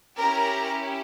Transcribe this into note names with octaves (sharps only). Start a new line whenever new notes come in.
C#4 E4 G4 A#4 A#5